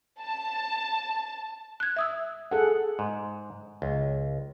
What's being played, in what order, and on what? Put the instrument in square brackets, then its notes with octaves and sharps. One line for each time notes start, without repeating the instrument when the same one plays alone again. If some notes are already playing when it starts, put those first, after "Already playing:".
[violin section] A5
[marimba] F#6 G#6
E5 D#6 E6
[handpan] G#4 A4 F#5
[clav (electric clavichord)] G#2
C#2